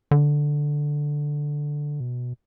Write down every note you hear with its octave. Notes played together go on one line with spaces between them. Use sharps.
D3
B2